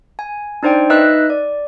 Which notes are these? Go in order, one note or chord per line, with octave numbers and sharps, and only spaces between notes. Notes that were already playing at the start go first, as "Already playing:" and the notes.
G#5
D4 D#4 C5 D5 G5
D#4 B4 D#5 E5 E6 F#6
D5